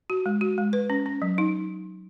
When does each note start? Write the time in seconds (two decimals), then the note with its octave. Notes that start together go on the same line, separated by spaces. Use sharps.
0.10 F#4
0.26 G#3
0.41 F#4
0.58 G#3
0.73 B4
0.90 C#4
1.06 C#4
1.22 F#3
1.38 D#4